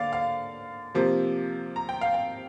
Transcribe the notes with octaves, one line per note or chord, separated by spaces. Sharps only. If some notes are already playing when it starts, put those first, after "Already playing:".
Already playing: D3 A#3 D5 F5
F5
C3 F3 A#3
A#5
G5
F5
G5